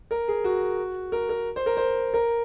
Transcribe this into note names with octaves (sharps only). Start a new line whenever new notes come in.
A#4
G#4
F#4
A#4
A#4
C5
A#4
C5
A#4